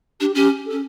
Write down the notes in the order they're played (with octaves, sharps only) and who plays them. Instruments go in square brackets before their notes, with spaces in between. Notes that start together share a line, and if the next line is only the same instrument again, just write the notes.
[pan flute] D4 [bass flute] G4
[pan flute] C#4 [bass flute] G4
[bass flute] A4
[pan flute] C#4